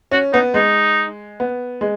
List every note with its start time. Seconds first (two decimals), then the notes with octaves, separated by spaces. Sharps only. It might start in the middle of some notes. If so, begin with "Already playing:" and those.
0.11 C#4 F#4
0.33 B3 D#4
0.54 G#3 D#4
1.40 B3
1.81 G#3